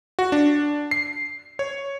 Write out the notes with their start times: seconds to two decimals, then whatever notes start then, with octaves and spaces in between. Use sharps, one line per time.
0.19 F#4
0.32 D4
0.91 C7
1.59 C#5